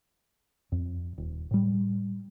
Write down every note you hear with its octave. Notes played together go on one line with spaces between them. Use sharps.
F2
D#1
A2 G3